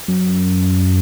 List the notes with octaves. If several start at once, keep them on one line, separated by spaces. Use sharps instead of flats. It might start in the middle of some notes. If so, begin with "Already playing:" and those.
F#2